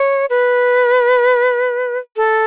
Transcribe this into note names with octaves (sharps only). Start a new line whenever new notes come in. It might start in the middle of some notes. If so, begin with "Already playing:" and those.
Already playing: C#5
B4
A4